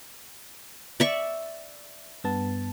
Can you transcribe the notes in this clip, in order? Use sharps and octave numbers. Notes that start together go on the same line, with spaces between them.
D5 E5 C#6
G2 B3 A5